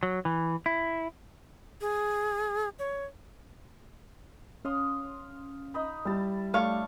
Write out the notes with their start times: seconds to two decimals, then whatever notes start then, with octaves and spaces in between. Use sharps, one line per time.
0.03 F#3
0.25 E3
0.66 E4
1.81 G#4
2.79 C#5
4.65 C#4 F5 C6 D#6
5.74 D#4 D#5 B5
6.05 G3 E4 A5
6.54 A3 D4 C#5 F5 C#6